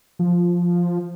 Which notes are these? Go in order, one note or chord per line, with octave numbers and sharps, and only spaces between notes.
F3